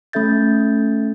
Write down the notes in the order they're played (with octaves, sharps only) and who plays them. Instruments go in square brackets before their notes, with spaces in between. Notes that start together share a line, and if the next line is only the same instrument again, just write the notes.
[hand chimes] A3 C#4 A4 E5 G6 A6